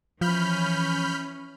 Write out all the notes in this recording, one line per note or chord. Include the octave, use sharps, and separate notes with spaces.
E3 F3 C#4 B5 F6 G6